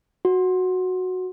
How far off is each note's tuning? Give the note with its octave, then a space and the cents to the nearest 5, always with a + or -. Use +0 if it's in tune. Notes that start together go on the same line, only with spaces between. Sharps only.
F#4 -5